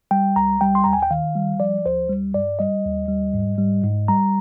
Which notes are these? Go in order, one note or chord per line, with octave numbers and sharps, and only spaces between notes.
G3 G5
C2 A#5
G3 G5
C6
D#2 A#5
G#5
G5
D#3 F5
G3
F3 D5
D2 C5
G3
G2 D5
G3 D#5
D#2
G3
G#2
G3
G#2
G3 A#5